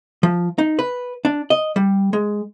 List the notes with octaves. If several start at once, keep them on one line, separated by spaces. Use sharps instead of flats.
F3
D#4
B4
D4
D#5
G3
G#3